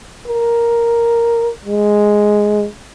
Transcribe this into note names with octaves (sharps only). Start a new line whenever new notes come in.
A#4
G#3